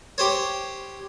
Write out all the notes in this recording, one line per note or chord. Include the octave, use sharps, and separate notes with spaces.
G4 C5 C#5